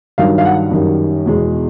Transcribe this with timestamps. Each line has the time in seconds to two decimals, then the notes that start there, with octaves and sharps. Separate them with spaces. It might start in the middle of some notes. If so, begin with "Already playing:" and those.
0.18 G2 D#3 F#3 F5
0.38 F5
0.45 F#5
0.71 F#2 D#3 G3
1.26 E2 B2 G#3